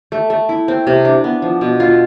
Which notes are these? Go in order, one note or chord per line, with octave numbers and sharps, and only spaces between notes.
A3
A3
E4
C4
C3
D4
B3
F3
B2
F4